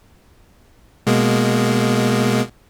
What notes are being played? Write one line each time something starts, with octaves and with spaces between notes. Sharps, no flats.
B2 G#3 A#3